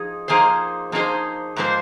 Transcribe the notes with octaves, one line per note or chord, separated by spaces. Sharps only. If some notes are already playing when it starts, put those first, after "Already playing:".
Already playing: F3 D#4 G#4
F3 A#3 D#4 G#4 C5
F3 A#3 D#4 G#4 C5
G#2 F3 A#3 G#4 C5